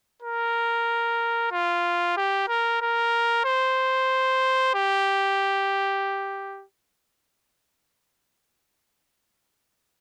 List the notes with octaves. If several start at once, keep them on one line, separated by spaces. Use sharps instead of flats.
A#4
F4
G4
A#4
A#4
C5
G4